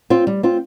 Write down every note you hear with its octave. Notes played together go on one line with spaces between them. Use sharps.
C4 F4
G3
C4 F4